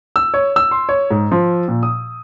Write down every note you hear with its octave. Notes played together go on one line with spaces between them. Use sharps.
E6
C#5
E6
C6
C#5
G#2
F3
A#2
D#6